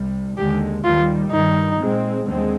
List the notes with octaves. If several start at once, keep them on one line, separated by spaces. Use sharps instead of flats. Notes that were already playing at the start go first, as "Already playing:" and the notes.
Already playing: C2 C3 G3
D#2 D3 G#3 G4
D#2 D#3 G3 F4
G2 D#3 G3 D#4
A#2 G#3 C4
D#2 D3 G#3 C4